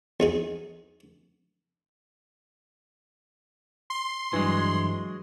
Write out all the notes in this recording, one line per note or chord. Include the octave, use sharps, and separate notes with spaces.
E2 D#4 G#4
C6
G2 E3 F#3 G#3